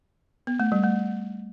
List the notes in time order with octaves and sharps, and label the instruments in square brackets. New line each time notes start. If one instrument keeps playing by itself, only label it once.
[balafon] B3
A3
G3
A3